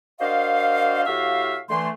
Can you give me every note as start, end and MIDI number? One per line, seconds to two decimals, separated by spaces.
0.20 1.02 62
0.20 1.02 66
0.20 1.02 70
0.20 1.02 72
0.20 1.02 75
0.20 1.02 77
1.06 1.57 45
1.06 1.57 66
1.06 1.57 67
1.06 1.57 76
1.06 1.57 77
1.70 1.89 50
1.70 1.89 52
1.70 1.89 57
1.70 1.89 84